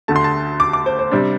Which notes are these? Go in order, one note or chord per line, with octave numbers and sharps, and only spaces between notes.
D2 D3 A3 A5
C6
A5
D6
D6
C5
C5
C3 G3 D4 C5